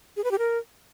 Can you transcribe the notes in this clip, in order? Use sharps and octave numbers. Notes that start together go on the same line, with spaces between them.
G#4
B4
G4
A#4